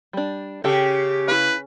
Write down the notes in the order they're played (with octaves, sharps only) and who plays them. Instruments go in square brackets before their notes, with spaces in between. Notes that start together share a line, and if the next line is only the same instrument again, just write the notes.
[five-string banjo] G3 D4
[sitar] C#3 [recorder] G4 [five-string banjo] A4 G5
[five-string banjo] E4 F5 [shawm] B4